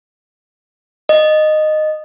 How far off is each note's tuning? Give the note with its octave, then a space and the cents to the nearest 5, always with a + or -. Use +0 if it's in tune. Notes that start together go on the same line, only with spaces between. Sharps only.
D#5 -15